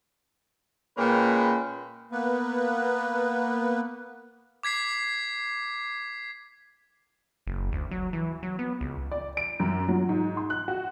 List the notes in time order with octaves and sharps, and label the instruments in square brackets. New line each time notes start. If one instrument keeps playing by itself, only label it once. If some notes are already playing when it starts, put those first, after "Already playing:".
[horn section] A#2 G#3 A#3 C#4 B4 G5
[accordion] A#3 B3 B4
[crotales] D6 G#6 B6 C7
[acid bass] F#1
D2
F#3
E3
F#3
B3
C#2
[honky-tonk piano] D5
D7
F#2
F#3
G#2
C6
F#6
F#4